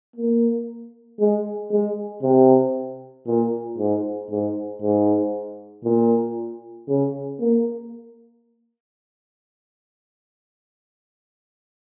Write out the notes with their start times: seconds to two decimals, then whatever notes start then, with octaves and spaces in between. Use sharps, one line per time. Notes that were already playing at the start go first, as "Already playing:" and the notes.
0.16 A#3
1.19 G#3
1.71 G#3
2.23 C3
3.27 A#2
3.78 G#2
4.31 G#2
4.82 G#2
5.85 A#2
6.88 C#3
7.41 A#3